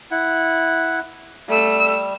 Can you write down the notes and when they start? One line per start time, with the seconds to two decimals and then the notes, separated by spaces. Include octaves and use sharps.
0.11 E4 F#5
1.49 G3 A3 E6